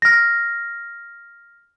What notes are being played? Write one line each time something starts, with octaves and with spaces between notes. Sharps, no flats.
F6 A#6